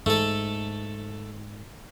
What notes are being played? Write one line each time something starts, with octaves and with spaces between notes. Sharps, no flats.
G#2 A3 A4